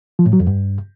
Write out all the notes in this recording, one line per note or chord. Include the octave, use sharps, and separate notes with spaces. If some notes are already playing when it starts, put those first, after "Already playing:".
F3
A2
F#3
F2
G2